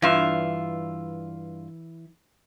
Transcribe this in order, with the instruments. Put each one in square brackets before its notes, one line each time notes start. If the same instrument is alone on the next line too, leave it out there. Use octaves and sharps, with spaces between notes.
[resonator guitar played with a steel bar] G2 F4 [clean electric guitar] E3 E5